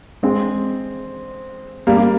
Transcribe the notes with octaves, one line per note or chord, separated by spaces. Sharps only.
G#3 C4
G3 A#3
A#3